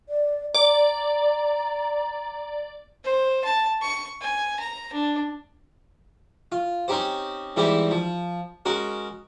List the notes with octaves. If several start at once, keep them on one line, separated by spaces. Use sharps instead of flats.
D5
D5 A#5
C5
A5
C#6
G#5
A#5
D4
F4
C4 C#4 D#4 G4 C5
G#2 E3 G3 C4 E4 G4
F3
G#3 C#4 F#4 A#4